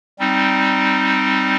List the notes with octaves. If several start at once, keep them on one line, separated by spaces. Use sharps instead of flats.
G3 C4 D#4